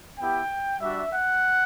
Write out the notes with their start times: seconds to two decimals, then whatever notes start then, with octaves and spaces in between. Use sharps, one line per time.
0.18 B3 E4 G4 G5
0.81 G3 D4 F#4 E5
1.12 F#5